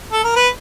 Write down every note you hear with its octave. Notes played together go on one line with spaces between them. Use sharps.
A4
A#4
B4